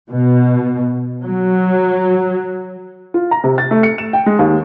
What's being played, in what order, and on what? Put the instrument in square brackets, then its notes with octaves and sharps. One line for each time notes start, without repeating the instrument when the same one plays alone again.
[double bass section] B2
F#3
[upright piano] F4
A#5
C3
A6
A3
C#7
E7
G5
G#3
D#2